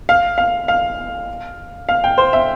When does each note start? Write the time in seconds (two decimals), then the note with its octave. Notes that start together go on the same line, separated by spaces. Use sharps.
0.09 F5
0.38 F5
0.68 F5
1.89 F5
2.04 G5
2.18 C5
2.33 E5